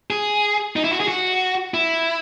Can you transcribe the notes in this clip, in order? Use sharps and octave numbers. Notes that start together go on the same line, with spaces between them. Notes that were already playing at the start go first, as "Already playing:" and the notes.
G#4
D#4
E4
F#4
G#4
F#4
E4